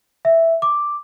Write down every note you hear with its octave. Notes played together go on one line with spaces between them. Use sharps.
E5
D6